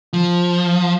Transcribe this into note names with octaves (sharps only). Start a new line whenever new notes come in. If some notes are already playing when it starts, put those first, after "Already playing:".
F3